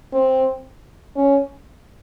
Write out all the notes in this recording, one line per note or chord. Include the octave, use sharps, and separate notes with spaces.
C4
C#4